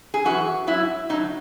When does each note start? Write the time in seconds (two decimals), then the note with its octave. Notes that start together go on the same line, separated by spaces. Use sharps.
0.14 G#4
0.24 F#2 E3 F#4
0.67 G#2 F#3 E4
1.09 A2 F#3 D#4